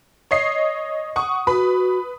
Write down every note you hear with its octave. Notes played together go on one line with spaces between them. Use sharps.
C#5 D#5 C7
F#5 C#6 D#6
F#4 B4 B5